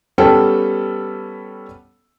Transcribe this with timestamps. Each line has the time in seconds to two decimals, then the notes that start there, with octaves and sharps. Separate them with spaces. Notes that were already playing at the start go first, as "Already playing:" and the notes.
0.18 G3 B3 C#4 A4 F#5 G5